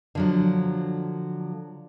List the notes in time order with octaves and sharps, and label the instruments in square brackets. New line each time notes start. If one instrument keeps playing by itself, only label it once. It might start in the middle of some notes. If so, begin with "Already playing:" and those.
[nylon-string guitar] D3 F3 F#3